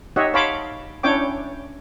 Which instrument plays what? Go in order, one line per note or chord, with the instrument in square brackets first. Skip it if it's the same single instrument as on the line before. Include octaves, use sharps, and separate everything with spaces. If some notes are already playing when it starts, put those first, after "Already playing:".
[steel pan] D#4 G4 C#5 D#5 E5 F#5
C#5 F5 A5 B5 C6 D6
C#4 D4 E4 C#5 G5 D6